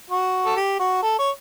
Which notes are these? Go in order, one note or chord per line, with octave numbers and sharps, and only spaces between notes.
F#4
A4
G4
F#4
A4
C#5